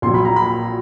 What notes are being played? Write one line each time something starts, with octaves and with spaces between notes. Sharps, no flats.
A#1 A#2 F#3 C6
B5
A#5
B5